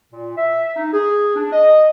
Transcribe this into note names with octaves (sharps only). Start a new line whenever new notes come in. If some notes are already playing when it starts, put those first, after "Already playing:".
A#2
E5
D#4
G#4
D4
D#5